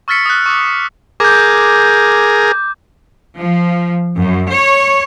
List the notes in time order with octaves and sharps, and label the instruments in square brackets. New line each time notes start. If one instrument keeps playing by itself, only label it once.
[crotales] C#6 E6 F6 A6 B6 C#7
D#6 F#6
C#6 D6
[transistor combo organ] G#4 A#4 [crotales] D6 G6
[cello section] F3
F#2
C#5